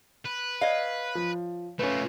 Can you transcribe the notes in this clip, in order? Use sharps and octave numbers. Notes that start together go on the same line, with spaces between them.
B4
C#5 D#5 F5
F3
A3 C#4 F4 B4